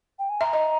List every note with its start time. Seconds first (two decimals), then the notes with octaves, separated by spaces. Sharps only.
0.19 G5
0.29 G#5
0.41 E5 A#5
0.53 D#5